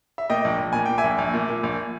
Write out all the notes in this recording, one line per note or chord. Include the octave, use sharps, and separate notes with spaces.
E5
A#2 D#5 G5
A#1
A#1
A#2 G#5
A#2 G5
E5 G#5
A#1
A#1
A#2
A#2
A#1